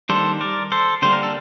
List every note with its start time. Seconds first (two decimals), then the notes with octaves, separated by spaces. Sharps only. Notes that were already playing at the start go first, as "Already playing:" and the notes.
0.09 D#3 G3 A#3 D4 A4 C5
0.41 A#4 D5
0.72 A4 C5
1.02 D3 G3 A#3 C5
1.13 A#4
1.23 A4